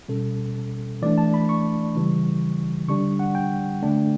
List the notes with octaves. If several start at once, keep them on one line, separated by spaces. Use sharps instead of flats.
B2 G3 C#4 A4
E3 A3 D4 D5
A5
B5
C#6
C#3 E3 G3
D3 G3 D4 C#6
F#5
G5
D3 A3 D4